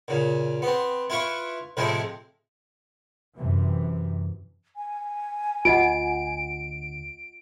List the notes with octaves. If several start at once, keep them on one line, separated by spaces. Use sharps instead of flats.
A#2 C#3
B3 C4
E4 F4 B4 C#6
A2 C3 F3 G#3 C4 E4
F#2 C3 E3
G#5
D2 F4 D#5 F#5 D7